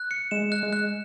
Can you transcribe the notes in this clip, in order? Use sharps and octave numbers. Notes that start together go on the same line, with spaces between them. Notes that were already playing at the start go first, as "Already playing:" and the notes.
Already playing: F#6
C#7
G#3 E7
F#6
G#3
F#6